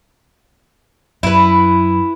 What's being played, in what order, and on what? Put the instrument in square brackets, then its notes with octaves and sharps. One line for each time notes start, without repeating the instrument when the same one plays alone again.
[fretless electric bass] F#2 [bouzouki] E4 B4